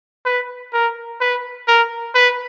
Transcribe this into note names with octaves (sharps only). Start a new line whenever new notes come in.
B4
A#4
B4
A#4
B4